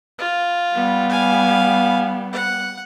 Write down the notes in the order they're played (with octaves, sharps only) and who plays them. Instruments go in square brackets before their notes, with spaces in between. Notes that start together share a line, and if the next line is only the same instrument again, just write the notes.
[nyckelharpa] F4
[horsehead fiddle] G3 B3
[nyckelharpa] F5 G#5
F#5